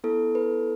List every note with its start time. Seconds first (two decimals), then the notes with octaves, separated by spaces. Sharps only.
0.04 B3 E4 A4
0.35 B4